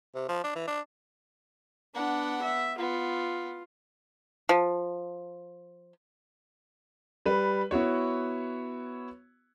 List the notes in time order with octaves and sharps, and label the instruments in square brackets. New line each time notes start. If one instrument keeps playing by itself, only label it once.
[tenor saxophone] C3
F3
D4
E3
D4
[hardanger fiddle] B3 F#5 [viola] D4
[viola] E5
[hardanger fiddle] B3 [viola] F4
[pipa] F3
[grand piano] G3 B4
B3 E4 F#4 C#5